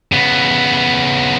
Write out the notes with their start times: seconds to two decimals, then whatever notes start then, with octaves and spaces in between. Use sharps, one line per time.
0.12 C#3 B3